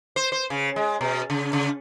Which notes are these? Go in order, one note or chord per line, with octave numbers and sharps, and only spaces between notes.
C5
C5
C#3
G#3
B2
C#3
C#3